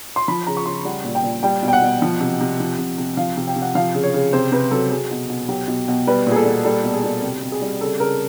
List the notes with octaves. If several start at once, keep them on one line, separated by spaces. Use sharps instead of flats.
C6
F3 B5
C#3 A#5
C#6
C#3 C6
G3 F#5
A#2
G5
A#2
G3 G5
B2
G5
F#5
B2
F3
C3
C3
F3
C3
C3
F3 F5
C3
G5
C3
F#5
F3 F5
C#3
C#5
C#3
C3 C5
C3 B4
F#3 A4
F#3 G#4
B2
B2
F#3 G4
B2
B2
G3 B4
A#2
G#4
A4
A#2
G3 A4
B2
G#4
B2
C3 G4
C3
G#4
G3
C#3 A4
C#3 A#4